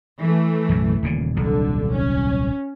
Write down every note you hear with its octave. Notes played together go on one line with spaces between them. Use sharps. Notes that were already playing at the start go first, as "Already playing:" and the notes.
E3 A3
B1 F#2 A2
D#1 A#2 C#3
D#1 C2 D3 F#3
C#4